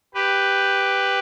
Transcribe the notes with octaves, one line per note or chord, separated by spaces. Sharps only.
G4 B4